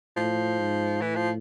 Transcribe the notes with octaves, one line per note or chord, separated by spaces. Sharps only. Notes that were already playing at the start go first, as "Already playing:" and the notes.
A2 F3
G#2
A2 E3
F3